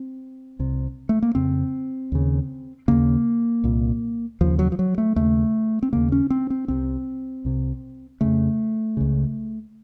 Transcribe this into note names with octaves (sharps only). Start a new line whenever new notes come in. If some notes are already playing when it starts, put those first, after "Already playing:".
Already playing: C4
C2 C3
A3
A#3
F2 C#3 C4
D#2 C#3
D#2 C#3 A#3
C2 A#2
D#2 C#3 F3
F#3
F3
F#3
A3
D#2 C#3 A3
C4
D#2 C#3 A#3
C#4
C4
C4
C2 C3 C4
C2 C3
F2 C#3 A3
C#2 C#3